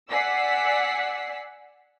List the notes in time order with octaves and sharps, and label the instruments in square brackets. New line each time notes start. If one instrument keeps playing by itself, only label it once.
[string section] D5 F#5 G#5 E6 B6 C7